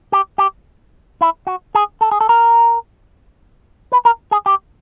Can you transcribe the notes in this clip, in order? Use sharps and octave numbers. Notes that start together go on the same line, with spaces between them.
G4
G4
E4
F#4
G#4
A4
G#4
A4
A#4
B4
A#4
G#4
G4